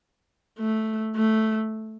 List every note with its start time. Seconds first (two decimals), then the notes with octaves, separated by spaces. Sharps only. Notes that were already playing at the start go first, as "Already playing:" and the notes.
0.59 A3
1.16 A3